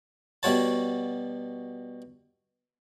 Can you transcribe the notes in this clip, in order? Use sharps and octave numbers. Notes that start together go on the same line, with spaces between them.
B2 G3 F#4 C#5 A5